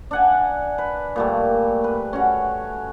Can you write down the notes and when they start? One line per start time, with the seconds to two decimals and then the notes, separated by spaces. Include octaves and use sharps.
0.11 D4 F#5 G#5
0.78 B4
1.16 A#2 G3 A3
1.84 B4
2.13 C#4 F#4